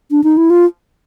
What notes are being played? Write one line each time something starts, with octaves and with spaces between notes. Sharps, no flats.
D4
D#4
E4
F4